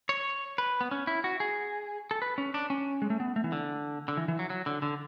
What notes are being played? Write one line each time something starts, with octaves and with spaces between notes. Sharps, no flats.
C#5
B4
B3
C#4
E4
F#4
G#4
A4
B4
C#4
D4
C#4
G#3
A3
B3
A3
E3
D3
D3
E3
E3
F#3
F#3
D3
D3